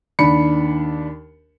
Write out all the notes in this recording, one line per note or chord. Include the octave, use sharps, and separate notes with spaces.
D#2 D4 B5 C#7